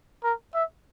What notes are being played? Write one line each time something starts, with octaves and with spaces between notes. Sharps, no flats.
A#4
E5